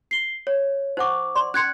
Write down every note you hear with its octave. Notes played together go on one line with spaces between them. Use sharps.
C7 G7
C#5
D#4 C5 F#5 C#6 D6
D5 C6
C#4 C6 F#6 G#6 C#7